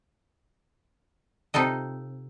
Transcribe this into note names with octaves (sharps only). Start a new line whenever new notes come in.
C3 D#4 F4 A4 D#5